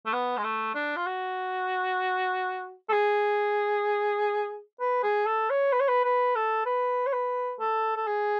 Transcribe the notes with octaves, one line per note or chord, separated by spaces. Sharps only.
A3
B3
G#3
A3
D4
F4
F#4
A4
G#4
B4
G#4
A4
C#5
B4
C#5
B4
B4
A4
B4
C#5
B4
A4
A4
G#4